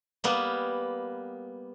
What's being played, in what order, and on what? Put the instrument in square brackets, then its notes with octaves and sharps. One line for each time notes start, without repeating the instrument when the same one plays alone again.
[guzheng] G3 A#3 B3